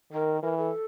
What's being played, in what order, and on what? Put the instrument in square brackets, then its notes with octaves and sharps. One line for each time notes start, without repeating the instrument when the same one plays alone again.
[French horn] D#3 [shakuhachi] A#4
[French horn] E3 [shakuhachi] A#4
[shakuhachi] A4